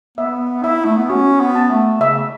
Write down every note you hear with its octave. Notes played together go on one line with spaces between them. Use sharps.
B3 E5
E4 E5
A3
B3
C#4 F#4
B3
A5
A3
C#3 E5